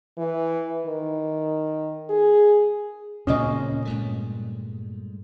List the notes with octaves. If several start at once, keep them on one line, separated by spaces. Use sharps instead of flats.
E3
D#3
G#4
D2 A#2 C#3 C4 C#4 D#5
G2 G#3 A3